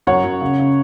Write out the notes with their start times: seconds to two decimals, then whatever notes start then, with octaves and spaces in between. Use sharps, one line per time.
0.07 F#2 C#5 F#5
0.24 F#2
0.41 C#3
0.59 C#3